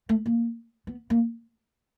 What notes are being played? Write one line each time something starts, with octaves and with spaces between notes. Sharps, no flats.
A3
A#3
B3
A#3